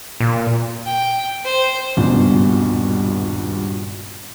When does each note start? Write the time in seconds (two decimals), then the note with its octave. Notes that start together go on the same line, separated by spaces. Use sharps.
0.20 A#2
0.85 G5
1.45 C5
1.97 D#1 G#1 C#2 G2 B2